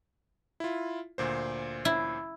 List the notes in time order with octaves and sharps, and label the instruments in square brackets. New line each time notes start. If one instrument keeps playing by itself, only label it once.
[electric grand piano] E4 F4
D2 A#2 C5
[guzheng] E4